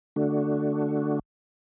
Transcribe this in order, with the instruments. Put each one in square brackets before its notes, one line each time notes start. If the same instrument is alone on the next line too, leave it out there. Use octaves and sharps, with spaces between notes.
[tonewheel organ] D3 A3 D4 F#4